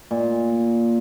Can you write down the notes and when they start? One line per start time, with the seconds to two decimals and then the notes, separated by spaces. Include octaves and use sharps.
0.11 A#2